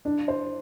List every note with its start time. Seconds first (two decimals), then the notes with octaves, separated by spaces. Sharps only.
0.05 D4
0.28 C5